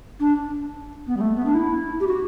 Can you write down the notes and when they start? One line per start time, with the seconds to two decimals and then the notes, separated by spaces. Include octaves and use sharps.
0.20 D4
1.07 B3
1.17 G3
1.21 A3
1.36 B3
1.46 D4
1.54 E4
2.00 G4
2.07 F#4